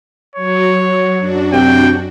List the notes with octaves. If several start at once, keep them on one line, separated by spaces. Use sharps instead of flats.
F#3 C#5
F#2 D4 F#4
C3 G5